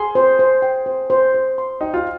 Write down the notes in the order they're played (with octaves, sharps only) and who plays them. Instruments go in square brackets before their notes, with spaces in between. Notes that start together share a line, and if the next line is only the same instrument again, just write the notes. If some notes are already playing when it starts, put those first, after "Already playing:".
Already playing: [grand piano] G#4 [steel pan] C6
[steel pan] C5
C5
G5
C5
C5
C5
C6
[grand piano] D#4 [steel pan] G5
[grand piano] F4